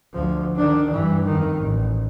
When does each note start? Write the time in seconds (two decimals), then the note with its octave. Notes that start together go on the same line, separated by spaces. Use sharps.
0.14 D2 F3
0.57 D#3 D4
0.90 G2 E3
1.26 F2 D#3
1.59 A1